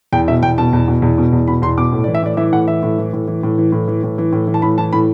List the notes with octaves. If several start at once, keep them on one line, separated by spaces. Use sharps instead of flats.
E2 G5
B2 E5
E2 G5
B2 A5
E2
B2
E2
B2
E2
B2 B5
E2 C6
B2 D6
A2
D5
E3
E5
A2 D5
E3 E5
A2 F#5
E3 E5
A2
E3
A2
E3
A2
E3
A2
E3
A2
E3
A2
E3
A5
A2 B5
E3 A5
A2 B5